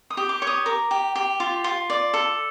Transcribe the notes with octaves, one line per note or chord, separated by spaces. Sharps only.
D#6
G4
D6
C#5
D#6
A#4 D6
G4
G4
F4
F4
D5
A4